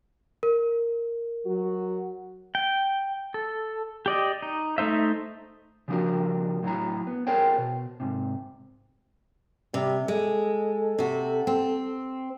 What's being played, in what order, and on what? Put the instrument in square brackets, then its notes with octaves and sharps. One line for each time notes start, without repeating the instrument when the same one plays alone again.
[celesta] A#4
[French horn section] F#3 F#4
[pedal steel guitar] G5
A4
G4 D5 D#5
D#4
A3 D#4 C5 E5
[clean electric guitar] C#3 F3 G3 D4 F#4 A#4
A2 F#3 E4 A#5
B3
G#4 A#4 C5 C#5 G5
B2
G#2 C3
[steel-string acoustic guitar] C3 [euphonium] G3
[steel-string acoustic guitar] G#3 [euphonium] A4
[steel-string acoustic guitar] C3 F#4
C4